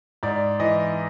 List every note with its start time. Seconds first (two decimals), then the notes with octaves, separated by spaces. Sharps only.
0.23 G#2 D5
0.60 E3 D#5